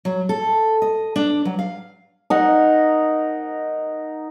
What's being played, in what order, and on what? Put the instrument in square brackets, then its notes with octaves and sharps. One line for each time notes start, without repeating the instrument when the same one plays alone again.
[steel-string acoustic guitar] F#3
A4
D#5
D4
F#3
F5
[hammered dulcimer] D#4 A#4 F#5